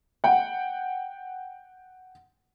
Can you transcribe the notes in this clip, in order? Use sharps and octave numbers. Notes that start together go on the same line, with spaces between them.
F#5 G5